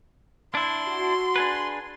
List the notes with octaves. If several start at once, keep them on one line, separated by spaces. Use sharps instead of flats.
D4 E4 C6
F#4
D4 G#4 B4